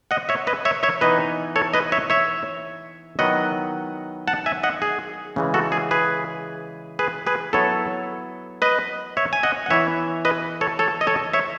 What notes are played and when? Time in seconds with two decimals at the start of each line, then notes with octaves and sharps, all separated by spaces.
0.11 D#5 F#5
0.29 C#5 E5
0.47 B4 D#5
0.65 C#5 E5
0.83 C#5 E5
1.01 E3 B3 D#4 B4 D#5
1.56 A4 C#5
1.74 B4 D#5
1.92 C#5 E5
2.10 C#5 E5
3.19 D#3 F#3 B3 E4 D#5 F#5
4.27 F#5 A5
4.46 E5 G#5
4.63 D#5 F#5
4.82 G#4
5.36 C#3 E3 G#3
5.54 F#4 A4
5.72 G#4
5.91 G#4 B4
6.99 G#4 B4
7.27 G#4 B4
7.53 F#3 B3 E4 A4 C#5
8.62 B4 D#5
9.17 C#5 E5
9.33 G#5
9.43 D#5 F#5
9.66 F#5
9.70 E3 B3 E4 C#5 E5
10.25 B4 D#5
10.61 A4 C#5
10.79 A4 C#5
11.01 D#5
11.07 A4 C#5
11.33 C#5 E5